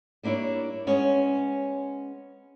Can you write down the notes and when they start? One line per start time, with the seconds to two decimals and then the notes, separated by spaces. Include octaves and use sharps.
0.23 G3 A#3 D4 E4 C#5
0.87 G#3 B3 C#4 C#5